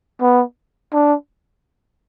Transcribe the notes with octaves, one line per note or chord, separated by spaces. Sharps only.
B3
D4